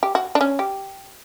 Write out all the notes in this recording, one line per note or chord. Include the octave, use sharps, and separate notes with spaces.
G4
F#4
D4
C#4
G4